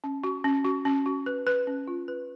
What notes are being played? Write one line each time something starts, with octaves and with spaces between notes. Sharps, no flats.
C#4
F#4
C#4
F#4
C#4
F#4
B4
B4
C#4
F4
B4